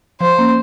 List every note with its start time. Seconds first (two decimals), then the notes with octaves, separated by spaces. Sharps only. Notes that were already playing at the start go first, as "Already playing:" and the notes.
0.21 F3 C5
0.39 A#3 C#4